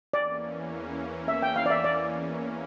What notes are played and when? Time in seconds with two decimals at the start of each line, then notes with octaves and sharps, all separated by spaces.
0.14 E2 E3 A#3 C#4 D5
1.28 E5
1.42 G5
1.56 F5
1.66 D5
1.70 E5
1.84 D5